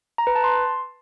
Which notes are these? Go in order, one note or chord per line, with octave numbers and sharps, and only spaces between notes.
A#5
B4
A5
C6